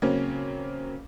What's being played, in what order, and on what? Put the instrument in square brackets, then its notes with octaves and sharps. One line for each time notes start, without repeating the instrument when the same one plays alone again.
[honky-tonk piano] C#3 F#3 A#3 C4 C#4